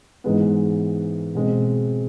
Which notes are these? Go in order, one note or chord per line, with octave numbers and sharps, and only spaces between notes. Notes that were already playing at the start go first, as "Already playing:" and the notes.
G#2 E3 G#3 B3
B2 G#3 C4